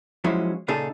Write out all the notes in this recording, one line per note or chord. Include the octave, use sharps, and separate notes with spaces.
F3 F#3 G#3 C#4 E4
A#2 C#3 D#4 G#4 A4